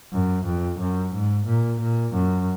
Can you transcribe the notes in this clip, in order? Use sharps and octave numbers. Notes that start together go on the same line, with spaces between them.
F#2
F2
F#2
G#2
A#2
A#2
F#2